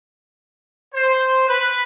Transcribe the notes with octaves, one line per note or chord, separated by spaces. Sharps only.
C5
B4